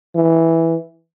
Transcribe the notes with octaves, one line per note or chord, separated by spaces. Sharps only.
E3